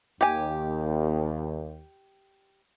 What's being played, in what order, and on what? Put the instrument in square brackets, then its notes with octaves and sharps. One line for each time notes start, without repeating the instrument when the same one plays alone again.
[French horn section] D#2 [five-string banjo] G4 G#5